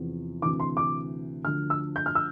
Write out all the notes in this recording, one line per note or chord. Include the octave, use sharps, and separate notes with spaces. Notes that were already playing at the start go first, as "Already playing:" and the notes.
Already playing: E2 C3 F3
D2 C3 E3 D6
C6
D6
D2 D3 F3 F6
E6
G6
F6
E6